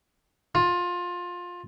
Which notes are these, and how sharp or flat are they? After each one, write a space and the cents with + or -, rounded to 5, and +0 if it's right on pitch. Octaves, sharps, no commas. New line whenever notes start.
F4 +20